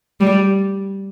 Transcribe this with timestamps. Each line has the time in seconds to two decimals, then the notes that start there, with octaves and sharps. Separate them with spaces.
0.20 G3